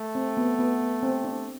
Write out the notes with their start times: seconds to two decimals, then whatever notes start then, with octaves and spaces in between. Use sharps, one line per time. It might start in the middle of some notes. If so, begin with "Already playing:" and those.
Already playing: A3
0.15 C4
0.37 B3
0.59 B3
0.81 B3
1.03 C4
1.24 D4